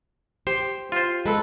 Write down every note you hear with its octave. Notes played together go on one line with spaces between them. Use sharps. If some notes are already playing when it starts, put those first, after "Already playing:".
G4 C5
F4 C5
G#3 A4 B4